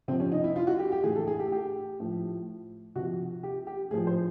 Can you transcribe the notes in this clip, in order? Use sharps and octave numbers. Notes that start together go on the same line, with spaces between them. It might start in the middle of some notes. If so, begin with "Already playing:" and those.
C3 F3 C4
C#4
D#4
E4
F4
F#4
G4
G4
A2 E3 G#4
A4
G#4
G4
G4
A2 F3
C3 F3 F#4
G4
G4
A2 F3 G#4
C5